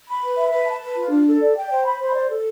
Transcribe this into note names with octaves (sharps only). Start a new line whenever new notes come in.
B5
B4
E5
B4
A5
B4
F4
D4
A4
D5
G5
C5
B5
C5
D5
A4